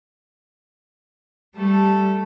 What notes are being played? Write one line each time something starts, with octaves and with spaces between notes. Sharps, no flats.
G3 A3 A4